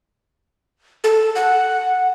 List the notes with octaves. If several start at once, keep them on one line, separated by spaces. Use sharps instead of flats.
A4
F#5